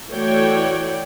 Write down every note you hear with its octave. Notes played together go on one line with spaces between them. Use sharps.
E3 A3 F#4 C#5 D5 G5